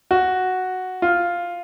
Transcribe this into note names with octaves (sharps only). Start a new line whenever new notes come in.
F#4
F4